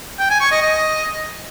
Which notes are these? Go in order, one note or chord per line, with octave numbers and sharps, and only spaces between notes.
G5
G#5
C#6
D#5
D#5